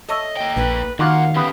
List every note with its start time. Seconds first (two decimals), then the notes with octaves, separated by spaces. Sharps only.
0.09 A4 C#5 D#5 E5
0.37 A#3 G5
0.57 A#1 B4
0.99 D#2 D#3 A#3 F4 F#4 F5 F#5
1.36 B3 C#4 G4